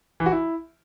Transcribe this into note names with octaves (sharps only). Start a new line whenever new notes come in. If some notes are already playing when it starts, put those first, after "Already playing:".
E3
F#4
E4